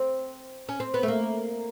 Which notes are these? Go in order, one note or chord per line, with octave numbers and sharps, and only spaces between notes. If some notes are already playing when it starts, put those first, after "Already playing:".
Already playing: C4
C#4
C4
B3
A3
A#3